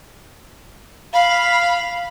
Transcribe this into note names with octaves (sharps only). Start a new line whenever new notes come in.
F5 B5